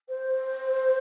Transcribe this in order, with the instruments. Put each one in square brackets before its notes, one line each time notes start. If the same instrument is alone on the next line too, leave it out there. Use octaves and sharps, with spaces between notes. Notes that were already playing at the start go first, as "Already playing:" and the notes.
[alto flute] C5